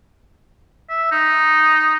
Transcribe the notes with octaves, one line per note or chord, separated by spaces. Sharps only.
E5
D#4